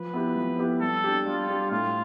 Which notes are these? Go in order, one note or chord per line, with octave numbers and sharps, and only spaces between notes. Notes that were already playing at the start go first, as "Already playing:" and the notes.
Already playing: F3 B4
B3 E4 G4
F3
B3 E4 G4
G3 A4
D4 G4
G3 F4
D4 G4
A2 F4